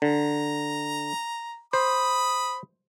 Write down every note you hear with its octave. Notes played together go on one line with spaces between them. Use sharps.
D3 A#5
C5 B5 D#6